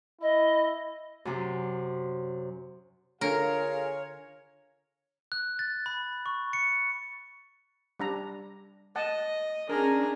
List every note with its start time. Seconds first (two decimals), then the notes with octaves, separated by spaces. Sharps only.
0.21 E4 D#5
1.25 F#2 C3
3.21 D3 F4 G#4 A#4 C#5 F5
5.32 F#6
5.59 A6
5.86 B5
6.26 C#6
6.53 C#7
8.00 G3 D4 A#5
8.96 D#5 F#5 A5
9.69 C#4 D4 G#4 A#4 A#5